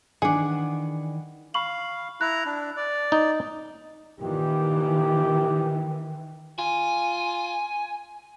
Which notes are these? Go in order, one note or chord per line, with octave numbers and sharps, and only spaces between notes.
D#3 E3 D4 G#4 F#5
F5 B5 C#6 F#7
E4 A#5 F#6
D4
D5
D#4
A#2 D#3 E3 G4
F4 G#5